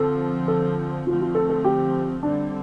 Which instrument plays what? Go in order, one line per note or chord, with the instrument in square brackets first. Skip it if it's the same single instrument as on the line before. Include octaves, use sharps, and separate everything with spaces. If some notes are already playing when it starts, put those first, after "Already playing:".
Already playing: [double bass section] D3 F3 C4 [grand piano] A4
[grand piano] A4
[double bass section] D3 F3 A3 C4 [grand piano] F4
[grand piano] F4
A4
A4
G4
[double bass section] D3 G3 C4 [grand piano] D4